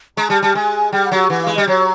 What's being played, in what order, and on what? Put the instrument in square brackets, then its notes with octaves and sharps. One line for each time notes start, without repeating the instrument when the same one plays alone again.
[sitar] G#3 [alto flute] A#5
[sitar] G3 [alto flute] A5
[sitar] G3 [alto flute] A5
[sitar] G#3 [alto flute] G#5
[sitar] G3 [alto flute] G5
[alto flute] F#5
[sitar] F#3
[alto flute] F#5
[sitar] E3 [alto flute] F#5
[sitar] G#3 [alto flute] F5
[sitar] G3 [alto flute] D#5
[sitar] F#3 [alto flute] C#5